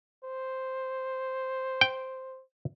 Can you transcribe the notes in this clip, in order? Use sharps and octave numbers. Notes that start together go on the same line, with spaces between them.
C5
G5